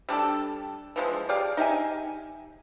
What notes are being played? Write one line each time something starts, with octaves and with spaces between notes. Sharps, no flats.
G3 D4 G4 A4
E3 F3 G#3
G4 G#4 D5 F5
D#4 G4 E5 G#5